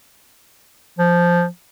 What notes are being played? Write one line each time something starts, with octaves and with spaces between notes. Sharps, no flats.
F3